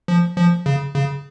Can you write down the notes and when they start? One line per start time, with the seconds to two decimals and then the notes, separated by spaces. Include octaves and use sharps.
0.08 F3
0.37 F3
0.66 C#3
0.95 C#3